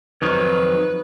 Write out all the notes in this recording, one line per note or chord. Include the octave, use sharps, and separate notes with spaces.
F2 D#3 F#3 B4